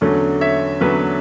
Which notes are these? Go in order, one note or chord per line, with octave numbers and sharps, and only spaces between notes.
E2 D3 F#3 A3 C#4
C#5 E5
E2 D3 F#3 A3 C#4 B4